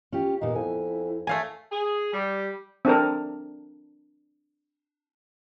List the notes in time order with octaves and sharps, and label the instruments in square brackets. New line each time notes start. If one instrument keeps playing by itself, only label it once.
[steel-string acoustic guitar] C#4 F4 G4
[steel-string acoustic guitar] A#2 B3 F5 [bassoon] D#4 [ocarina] G4
[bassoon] F2 [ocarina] E4 [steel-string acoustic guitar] G#5
[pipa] A3 F5 G#5 [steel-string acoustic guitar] A4 C#5 E5
[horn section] G#4
G3
[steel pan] C4 D4 A4 A#4